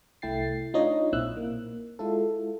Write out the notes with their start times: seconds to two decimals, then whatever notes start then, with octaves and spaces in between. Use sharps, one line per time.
0.22 C2 A3 E4 G5 A6 C7
0.74 D4 D#4 F4 C#5 D#5
1.12 B1 A#2 C4 E4 E6 F#6
1.37 A#3
1.99 G#3 E4 F4 A4